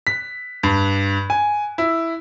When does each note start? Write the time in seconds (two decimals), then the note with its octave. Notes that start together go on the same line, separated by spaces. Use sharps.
0.07 B6
0.63 G2
1.30 G#5
1.78 E4